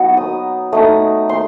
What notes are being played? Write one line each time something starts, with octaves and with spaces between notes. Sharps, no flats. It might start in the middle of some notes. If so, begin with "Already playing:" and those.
Already playing: F#3 B3 D#4
D#6
A3 D#4 D#6
C6